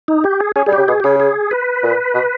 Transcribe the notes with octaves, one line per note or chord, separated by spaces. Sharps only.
D#4
G4
G#4
C#4 G#4
G3 G#4
C#3 G4
B2 G#4
G4
C#3 G#4
G#4
B4
A#2
B2